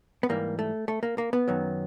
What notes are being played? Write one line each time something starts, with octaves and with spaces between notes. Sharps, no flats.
B3
G#2 E3 G3 A#3
A3
A3
A#3
A#3
B3
F#2 D#3 F#3